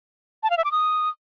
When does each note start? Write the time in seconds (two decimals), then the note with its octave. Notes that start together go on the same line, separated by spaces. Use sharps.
0.43 A5
0.50 F5
0.57 E5
0.65 D6
0.72 D#6